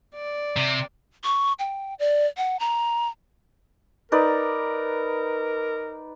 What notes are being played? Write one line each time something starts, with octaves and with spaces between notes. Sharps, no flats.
D5
C3
C#6
G5
D5
F#5
A#5
D#4 A#4 B4 D5